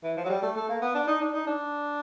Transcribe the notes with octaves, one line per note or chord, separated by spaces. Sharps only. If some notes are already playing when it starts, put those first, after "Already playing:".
E3
F3
F#3
G3
A3
A3
A#3
B3
D4
D#4
D4
D#4
D4